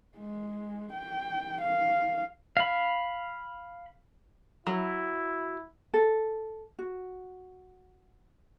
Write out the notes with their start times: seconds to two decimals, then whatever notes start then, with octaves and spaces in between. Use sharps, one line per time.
0.17 G#3
0.93 G5
1.62 F5
2.57 F5 B5
4.67 F#3 E4
5.94 A4
6.79 F#4